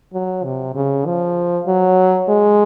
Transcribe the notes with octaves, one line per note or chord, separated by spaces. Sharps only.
F#3
C3
C#3
F3
F#3
G#3